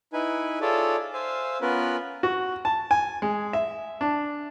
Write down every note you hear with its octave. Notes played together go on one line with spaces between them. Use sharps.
D#4 E4 B4 G#5
F4 G#4 A4 C#5 D5 E5
C5 E5 F5 G#5
B3 C#4 F4 A#4 B4
F#4
A5
G#5
G#3
E5
D4